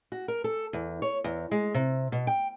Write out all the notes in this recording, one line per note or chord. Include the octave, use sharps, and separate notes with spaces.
F#4
A#4
A4
E2
C#5
E2
G#3
C3
B2
G5